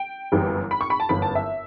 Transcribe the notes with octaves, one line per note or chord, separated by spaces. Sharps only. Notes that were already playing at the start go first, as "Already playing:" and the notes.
Already playing: G5
G1 F#2 E3 G3
B5
C#6
B5
A5
G1 F#2 E3 B5
A5
E5